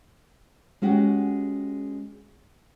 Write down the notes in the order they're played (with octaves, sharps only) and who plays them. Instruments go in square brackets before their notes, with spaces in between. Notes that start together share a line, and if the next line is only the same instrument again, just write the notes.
[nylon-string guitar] G#3 C#4 F#4 G4